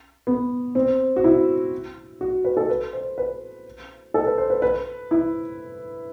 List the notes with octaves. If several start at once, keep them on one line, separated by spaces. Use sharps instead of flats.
B3
C4
F#4
E4
F#4
B4
A4
B4
C5
B4
A4
B4
C5
B4
B4
E4